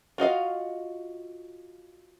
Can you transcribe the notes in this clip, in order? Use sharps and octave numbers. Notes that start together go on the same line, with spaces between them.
F4 F#4 D#5 F5